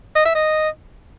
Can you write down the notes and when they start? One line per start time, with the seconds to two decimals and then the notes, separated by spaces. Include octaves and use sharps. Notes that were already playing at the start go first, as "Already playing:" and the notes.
0.15 D#5
0.25 E5
0.35 D#5